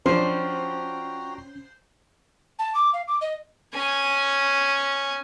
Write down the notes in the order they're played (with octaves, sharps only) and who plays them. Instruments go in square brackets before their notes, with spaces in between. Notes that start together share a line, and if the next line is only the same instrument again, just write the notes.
[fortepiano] F3 D4 [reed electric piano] C#4 [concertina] F#4 G5 A#5 [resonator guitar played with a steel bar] C5
[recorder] A5
D6
F5
D6
D#5
[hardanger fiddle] C#4 G#5